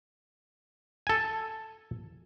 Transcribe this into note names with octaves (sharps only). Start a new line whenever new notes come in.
A4 G#5